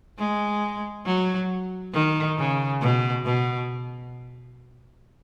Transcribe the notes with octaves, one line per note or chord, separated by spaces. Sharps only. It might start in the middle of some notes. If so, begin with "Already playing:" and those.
G#3
F#3
D#3
C#3
B2
B2